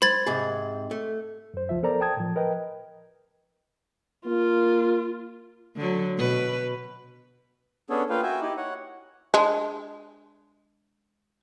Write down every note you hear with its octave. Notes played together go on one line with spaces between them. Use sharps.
C5 B5 G#6 A6
G#2 C3 G#4
A3
F#2 C5
C#2 F3 F4 E5
B3 A4 A#4 C5 D5 A#5
G5 A5 D#6 G#6
A2 F3
A#4 B4 D#5 G5
A#3 F4
D3 F#3
B2 B4
B3 C#4 D4 G#4 A4 C#5
A#3 F4 B4 F5 G5
F#4 E5 G5 G#5
D#4 E4 G4
C#5 F#5
G#3 D4